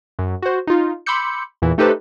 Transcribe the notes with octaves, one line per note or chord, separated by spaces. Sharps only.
F#2
F#4 C5
D#4 F4
B5 C6 D6 E6 G6 C#7
E2 A#2 E3
A3 D#4 G4 A4 B4 C5